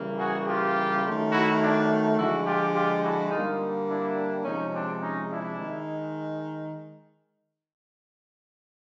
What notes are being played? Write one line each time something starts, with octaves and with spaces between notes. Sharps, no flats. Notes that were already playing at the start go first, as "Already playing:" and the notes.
Already playing: C#3 E3 G3 A#3
F#4 G#4
F4 G4
D#3 F#3 A3
E4 F#4
D4 E4
D3 F3 G#3 E4 F#4
F4 G4
F4 G4
E4 F#4
D3 G3 A#3 D#4 F4
D4 E4
C3 F3 G#3 C#4 D#4
C4 D4
C#4 D#4
D4 E4
D#3 G#3